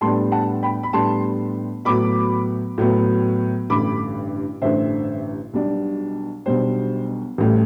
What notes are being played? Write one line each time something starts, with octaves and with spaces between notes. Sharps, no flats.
A2 G3 B3 D4 A5 C6
F#5 A5
G5 B5
B5
A2 G3 B3 D4 A5 C6
A2 F#3 B3 B5 D6
A2 F#3 B3
A1 G2 D3 B5 D6
A1 G2 D3 C5 E5
B1 B2 G3 D4
B1 B2 G3 D4 C5
A1 A2 G3